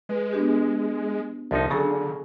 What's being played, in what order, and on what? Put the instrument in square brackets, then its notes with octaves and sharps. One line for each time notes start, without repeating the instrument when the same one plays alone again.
[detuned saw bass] G#3 [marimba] B4
[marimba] B3 D4 G4
[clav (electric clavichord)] C2 F3 D#4 [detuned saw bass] D3
[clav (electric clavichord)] C#3 F#3 [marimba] G#4 A4 G#5